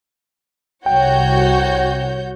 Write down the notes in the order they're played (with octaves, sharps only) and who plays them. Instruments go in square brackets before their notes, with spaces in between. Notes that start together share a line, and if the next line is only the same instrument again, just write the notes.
[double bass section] C2 [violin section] F#4 C#5 G6 [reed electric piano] G5